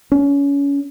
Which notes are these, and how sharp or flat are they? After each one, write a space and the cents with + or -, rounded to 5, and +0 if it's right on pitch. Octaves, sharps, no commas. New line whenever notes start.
C#4 +25